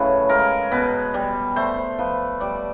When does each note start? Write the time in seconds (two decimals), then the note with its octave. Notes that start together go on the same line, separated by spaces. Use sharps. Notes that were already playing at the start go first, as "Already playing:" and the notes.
Already playing: A2 C#3 F#3 B4
0.29 G#3 A#4
0.71 B2 B4
1.14 G3
1.56 A3 C5
1.77 C5
1.99 F3 B4
2.40 G3 D5